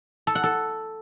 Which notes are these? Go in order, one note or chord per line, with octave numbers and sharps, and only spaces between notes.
A4
F#5
A4